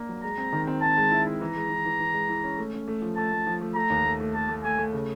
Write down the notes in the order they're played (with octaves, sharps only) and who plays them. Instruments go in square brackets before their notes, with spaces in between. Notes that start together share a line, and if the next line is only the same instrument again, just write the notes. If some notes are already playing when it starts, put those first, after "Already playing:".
Already playing: [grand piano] A#3 D4
F#3
[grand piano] G#3 [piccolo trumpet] A#5
[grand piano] C4
D#3
C4
[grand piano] C4 [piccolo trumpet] A5
[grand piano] G#3
E4
E4
[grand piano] E3 [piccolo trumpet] A#5
[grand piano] G#3
E3
E3
E3
G#3
E3
C#4
A3
C#4
A3
F3
[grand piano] A3 [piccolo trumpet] A5
[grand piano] A3
F3
A3
[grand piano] A3 [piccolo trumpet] A#5
[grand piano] D#2
A3
A3
[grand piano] A3 [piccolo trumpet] A5
[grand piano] A3
[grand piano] A3 [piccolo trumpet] G#5
[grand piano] A3
C#3